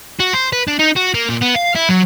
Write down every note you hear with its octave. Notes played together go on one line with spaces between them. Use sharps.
F#4
C5
B4
D4
D#4
F#4
A#3
A#2
B3
F5
E4
F#3